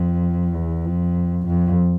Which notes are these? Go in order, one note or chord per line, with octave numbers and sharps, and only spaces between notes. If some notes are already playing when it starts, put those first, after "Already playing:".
Already playing: F2
E2
F2
F2